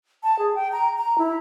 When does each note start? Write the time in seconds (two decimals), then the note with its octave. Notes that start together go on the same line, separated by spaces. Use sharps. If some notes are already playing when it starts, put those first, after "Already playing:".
0.23 A5
0.39 G#4
0.55 G5
0.72 A#5
0.98 A#5
1.18 E4